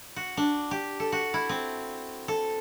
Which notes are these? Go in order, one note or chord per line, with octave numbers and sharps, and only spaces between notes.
F#4
D4
G4
A4
F#4
E4
C4
A4